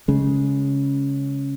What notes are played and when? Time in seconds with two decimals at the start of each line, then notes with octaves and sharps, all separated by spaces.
0.08 C#3 G#3